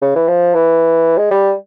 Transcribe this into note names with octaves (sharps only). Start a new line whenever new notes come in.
C#3
E3
F3
E3
G#3
G3